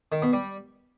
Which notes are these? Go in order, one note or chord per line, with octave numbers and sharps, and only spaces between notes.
D#3
B2
G3